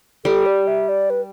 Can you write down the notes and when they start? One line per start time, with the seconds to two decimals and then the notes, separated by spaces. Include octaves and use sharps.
0.25 G3 A4
0.46 D5
0.67 E5
0.89 D5
1.10 B4